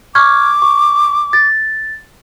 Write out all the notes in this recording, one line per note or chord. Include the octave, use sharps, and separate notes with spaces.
C#6 D6 F6 G#6
C#6
A6